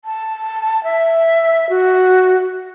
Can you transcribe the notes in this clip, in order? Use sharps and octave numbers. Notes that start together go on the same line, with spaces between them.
A5
E5
F#4